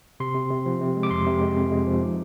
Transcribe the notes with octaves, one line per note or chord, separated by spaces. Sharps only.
C3 C6
C3
C3
F3
C3
G#3
D6
F2 C6
C3
G#3
F2
G#3
F3
D#4